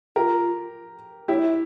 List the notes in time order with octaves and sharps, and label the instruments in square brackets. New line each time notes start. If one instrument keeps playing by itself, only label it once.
[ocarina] F4 [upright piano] G4 A#4
[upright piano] E4 G4 [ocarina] C#5
[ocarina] E5